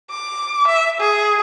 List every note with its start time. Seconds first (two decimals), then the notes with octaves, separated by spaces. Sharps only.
0.11 D6
0.68 E5
1.00 G#4